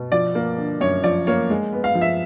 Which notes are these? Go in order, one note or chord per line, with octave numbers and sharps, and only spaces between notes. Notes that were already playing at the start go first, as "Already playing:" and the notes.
Already playing: B2 B3
F3 D5
A#3
D3
F#2 C#5
F3 D5
A#3 C#5
G#3
B3
F5
F3
E5